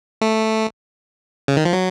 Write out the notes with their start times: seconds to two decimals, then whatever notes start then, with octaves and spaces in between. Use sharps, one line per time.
0.21 A3
1.48 C#3
1.56 D#3
1.65 F3
1.73 F#3